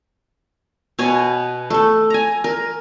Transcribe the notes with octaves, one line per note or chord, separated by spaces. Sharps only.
B2 C#5 G#5
A3 A4
G#5 A#5
A#4